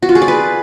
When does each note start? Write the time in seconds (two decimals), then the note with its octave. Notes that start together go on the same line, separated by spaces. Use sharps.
0.03 F#4
0.09 F4
0.15 G#4
0.22 D5
0.28 B4